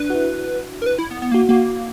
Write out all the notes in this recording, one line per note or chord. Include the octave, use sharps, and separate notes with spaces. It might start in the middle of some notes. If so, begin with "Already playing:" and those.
Already playing: D4 B4
F#4
E4
A#4
B4
E4
B3
B3
A#3 F#4
A#3 F#4